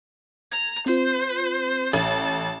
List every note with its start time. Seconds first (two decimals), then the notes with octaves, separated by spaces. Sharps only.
0.52 A#5 G#6
0.86 C4 F4 C5
1.93 A1 A5